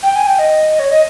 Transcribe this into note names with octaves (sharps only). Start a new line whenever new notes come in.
G5
G#5
G5
D#5
C#5
D#5